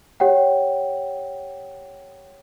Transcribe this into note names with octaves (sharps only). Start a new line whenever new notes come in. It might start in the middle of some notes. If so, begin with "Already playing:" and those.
G4 C#5 F#5 G5